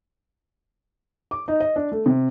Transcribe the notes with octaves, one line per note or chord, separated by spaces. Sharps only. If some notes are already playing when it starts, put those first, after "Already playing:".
D6
D#4
D#5
D4
A3
C3